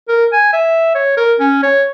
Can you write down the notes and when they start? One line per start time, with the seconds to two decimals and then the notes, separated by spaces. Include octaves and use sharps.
0.08 A#4
0.33 G#5
0.53 E5
0.95 C#5
1.17 A#4
1.40 C#4
1.63 C#5